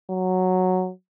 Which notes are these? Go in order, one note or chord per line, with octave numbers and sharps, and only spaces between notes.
F#3